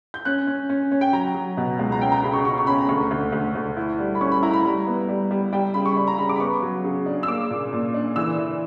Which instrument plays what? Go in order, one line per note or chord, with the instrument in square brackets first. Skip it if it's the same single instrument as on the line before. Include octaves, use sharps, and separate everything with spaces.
[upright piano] G6
C#4 F#6
C#4
C#4
C#4
G5
F#3 A#5
F#3
B2
C#2
A#5
C#4 G5
A#5
C#3 B5
C#6
C#3 C#6
C#6
C#4 B5
A#5
D2 C#6
D2
D2
D2
E4
G3
B5
C#4 C#6
B5
E4 A#5
B5
G3 A#5
B3
G3
G3
G3 G5
C#3 B5
C#6
G3 B5
A#5
C#3 B5
D6
B5
B3 C#6
F#3
C#3
D4
E6
A#3 D6
A#2
A#2
D4
E3 E6
E3